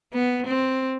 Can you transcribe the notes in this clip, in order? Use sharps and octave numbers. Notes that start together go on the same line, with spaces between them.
B3
C4